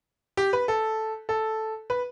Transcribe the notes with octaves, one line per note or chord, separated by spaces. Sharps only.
G4
B4
A4
A4
B4